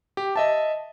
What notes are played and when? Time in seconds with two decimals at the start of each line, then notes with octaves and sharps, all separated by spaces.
0.17 G4
0.36 D#5 E5 A5